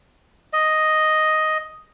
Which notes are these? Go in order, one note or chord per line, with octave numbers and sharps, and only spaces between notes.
D#5